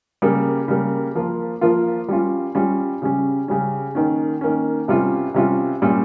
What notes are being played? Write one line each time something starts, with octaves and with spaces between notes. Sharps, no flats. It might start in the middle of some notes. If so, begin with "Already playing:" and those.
C#3 G3 A#3
C#3 G3 A#3
F3 A#3 F4
F3 A#3 F4
G3 C#4 F4
G3 C#4 F4
C#3 G3 C#4
C#3 G3 C#4
D#3 A#3 C#4
D#3 A#3 C#4
C3 G3 C#4 F4
C3 G3 C#4 F4
A#2 G3 C#4 F4